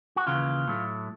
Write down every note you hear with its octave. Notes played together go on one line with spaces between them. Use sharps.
F#4
D#2 C#3 E3 F4
A2 F#3 A3